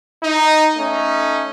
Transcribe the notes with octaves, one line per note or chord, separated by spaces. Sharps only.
D#4
A3 C#4 D#4